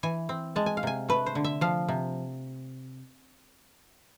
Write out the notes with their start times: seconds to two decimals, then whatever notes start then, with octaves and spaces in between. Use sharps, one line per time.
0.03 E3 G#5
0.29 C4
0.56 G#3 A5
0.66 G#5
0.77 F5
0.83 C3 G#5
1.09 A3 B4
1.26 C5
1.35 D3
1.44 E5
1.61 F3 F5
1.89 C3